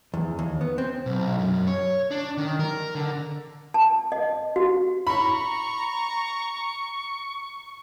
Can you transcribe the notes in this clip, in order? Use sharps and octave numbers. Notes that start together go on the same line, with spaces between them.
E2
D#2
B3
C4
B1
F#2
C#5
D4
D#3
A#4
D3
A5
D#5
F#4
A#5 B5 C#6